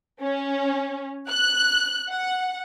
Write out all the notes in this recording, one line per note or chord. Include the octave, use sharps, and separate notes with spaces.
C#4
F#6
F#5